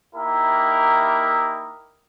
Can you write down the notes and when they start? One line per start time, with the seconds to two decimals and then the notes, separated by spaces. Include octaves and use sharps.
0.15 A#3 D#4 E4 G4 A#4